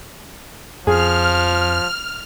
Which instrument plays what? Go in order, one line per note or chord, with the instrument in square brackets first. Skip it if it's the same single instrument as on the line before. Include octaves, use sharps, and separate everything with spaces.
[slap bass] F2 [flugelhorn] F3 [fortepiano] G#4 [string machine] F6